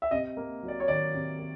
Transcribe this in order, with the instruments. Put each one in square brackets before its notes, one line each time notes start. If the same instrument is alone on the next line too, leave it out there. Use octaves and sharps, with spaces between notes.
[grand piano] E5
C3 D#5
A#3
F#3
D5
C#5
D#3 D5
C3
A#3